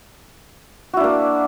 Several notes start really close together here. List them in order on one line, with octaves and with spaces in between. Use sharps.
F#4 E4 D4 A#3